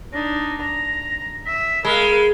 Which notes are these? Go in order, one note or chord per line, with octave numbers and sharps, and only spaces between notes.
D4 D#4 A#6
A#5 A#6
E5 B6
G#3 A#4 F5 B5